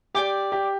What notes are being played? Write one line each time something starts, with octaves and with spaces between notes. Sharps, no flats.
G4 D5 G5 D6
G4